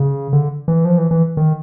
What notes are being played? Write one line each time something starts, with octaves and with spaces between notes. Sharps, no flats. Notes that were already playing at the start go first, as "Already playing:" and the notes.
Already playing: C#3
D3
E3
F3
E3
E3
D#3